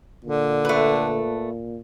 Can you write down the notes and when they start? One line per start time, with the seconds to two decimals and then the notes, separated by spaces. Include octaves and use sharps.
0.25 A#2 D3
0.65 A3 B4